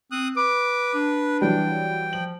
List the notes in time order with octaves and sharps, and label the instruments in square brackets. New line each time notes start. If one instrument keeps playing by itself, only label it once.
[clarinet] C4 [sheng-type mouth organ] D#6 F#6
[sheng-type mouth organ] B4 [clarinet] D6
[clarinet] D4
[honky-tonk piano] E3 F#3 G3 [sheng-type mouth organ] G5
[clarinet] F3 [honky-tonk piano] F#7